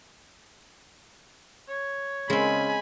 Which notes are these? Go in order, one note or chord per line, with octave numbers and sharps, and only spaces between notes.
C#5
C#3 G#3 C4 G#5 B5